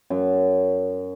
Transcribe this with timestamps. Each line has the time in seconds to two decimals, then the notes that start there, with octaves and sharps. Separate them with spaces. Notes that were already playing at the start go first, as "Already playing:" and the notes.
0.10 F#2